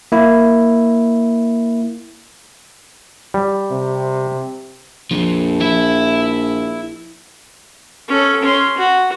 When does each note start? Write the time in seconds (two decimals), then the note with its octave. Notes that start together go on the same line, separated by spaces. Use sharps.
0.12 A#3 E4
3.34 G3
3.71 C3
5.11 A#1 F2 F3
5.60 E4 E5
8.08 C#4 A4
8.43 C#4 C6
8.78 F#4